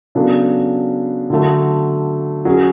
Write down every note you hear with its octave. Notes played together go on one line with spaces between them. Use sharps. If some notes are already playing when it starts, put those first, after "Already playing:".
C#3 F#3 B3 D4 A4
D3 F#3 A3
F#3 C#4 G#4